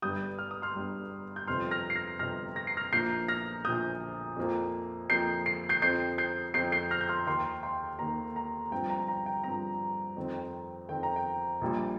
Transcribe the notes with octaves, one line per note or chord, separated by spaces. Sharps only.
G1 G2 G3 D#6 G6
F6
D#6
C6 F6
G1 G2 G3
G6
G1 F2 C3 F3 C6 F6
F6 A#6
C7
F6 A#6
G1 F2 C3 F3 F6 A#6
A#6
C7
F6 A#6
A#1 A#2 F3 A#3 G6 C7
F6 A#6
A#1 A#2 F3 A#3 D#6 G6
F2 F3 A#3
F2 F3 A#3 G6 C7
C7
G6 C7
F2 F3 C4 G6 C7
G6 C7
F2 F3 C4 G6 C7
G6 C7
F6 A#6
G6
C6 F6
D#2 D#3 A#3 G5 C6
G5 C6
D#2 D#3 A#3 A#5
A#5
G2 F3 C4 G5
A#5
G5
A#5
G5
G2 F3 C4 A#5
F2 D#3 C4
F2 D#3 C4 G5
A#5
G5
A#1 A#2 G3